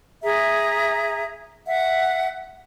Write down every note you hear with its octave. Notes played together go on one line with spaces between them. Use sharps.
G#4 E5 A#5
E5 F#5